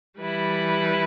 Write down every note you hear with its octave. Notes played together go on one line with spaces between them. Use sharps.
E3 G3 E4 B4